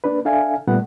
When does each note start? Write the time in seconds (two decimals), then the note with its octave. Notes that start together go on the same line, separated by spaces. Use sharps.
0.04 A#3 D4 B4
0.25 D4 A4 E5 F5 G#5
0.67 A#2 G3 A3 B3 F#5